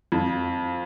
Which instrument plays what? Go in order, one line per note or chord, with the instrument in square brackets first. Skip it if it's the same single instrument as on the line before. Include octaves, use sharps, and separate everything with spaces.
[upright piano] F2